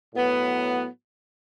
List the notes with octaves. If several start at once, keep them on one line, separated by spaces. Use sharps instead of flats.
A2 F#3 B3